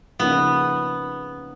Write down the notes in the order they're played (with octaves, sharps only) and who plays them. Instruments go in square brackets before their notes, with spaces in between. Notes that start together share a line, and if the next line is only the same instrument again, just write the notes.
[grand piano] C#3 F3 A#3 D#4 [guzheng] B3